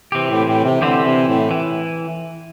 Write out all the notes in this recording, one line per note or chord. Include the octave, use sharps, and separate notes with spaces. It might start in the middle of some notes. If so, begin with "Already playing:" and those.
C3 E3 C4 G4
A2
A2
C3
D3 E3 C4 G4
C3
A2
E3